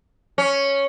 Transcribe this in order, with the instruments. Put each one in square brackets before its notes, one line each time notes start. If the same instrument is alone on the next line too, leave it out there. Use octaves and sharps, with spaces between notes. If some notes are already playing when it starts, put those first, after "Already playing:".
[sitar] C#4